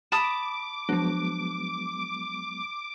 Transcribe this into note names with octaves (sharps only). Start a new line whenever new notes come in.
A5 B5 D6 D#6
F3 F#3 G#3 B3 D4